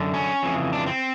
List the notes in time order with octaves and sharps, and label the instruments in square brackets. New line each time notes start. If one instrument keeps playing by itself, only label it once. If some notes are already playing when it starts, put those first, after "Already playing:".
Already playing: [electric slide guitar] F#2 D3
C#4
F2 C#3 E3
D4
C4